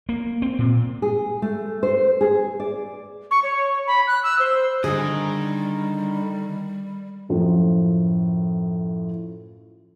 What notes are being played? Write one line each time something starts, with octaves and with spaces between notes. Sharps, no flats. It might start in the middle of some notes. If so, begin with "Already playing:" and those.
A#3
C4
A#2
G#4
A3
C5
G#4
D5
C#6
C#5
B5
F#6
E6
C5
D3 D#3 G3 G#4 D#5
F#2 A2 F3